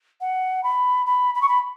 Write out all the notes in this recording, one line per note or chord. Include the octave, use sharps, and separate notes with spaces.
F#5
B5
B5
B5
C#6
B5